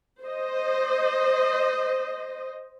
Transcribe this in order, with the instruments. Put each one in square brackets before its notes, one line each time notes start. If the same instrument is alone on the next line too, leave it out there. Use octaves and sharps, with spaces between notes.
[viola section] C5 D#5